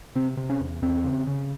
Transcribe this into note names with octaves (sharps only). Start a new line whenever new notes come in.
C3 C4
C3
C#4
E2
E2 C4
C#3
C#3